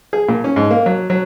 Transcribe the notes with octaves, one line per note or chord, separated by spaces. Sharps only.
G#4
A#2
C#4
G#2
A#3
F#3
F#3